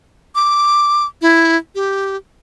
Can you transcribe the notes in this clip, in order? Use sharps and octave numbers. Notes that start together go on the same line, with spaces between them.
D6
E4
G4